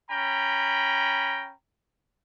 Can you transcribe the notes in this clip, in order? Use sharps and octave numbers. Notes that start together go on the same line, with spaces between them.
C#4 G5 A#5 B5